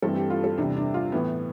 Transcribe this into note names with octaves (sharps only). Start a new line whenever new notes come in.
G2 E3 A3 C4 A4
G4
F4
A4
E2 C3 G3 D4
D4
F4
A2 E3 B3